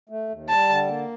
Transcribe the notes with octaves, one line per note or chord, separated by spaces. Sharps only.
A3
D#2
G3 A5
D3
A#3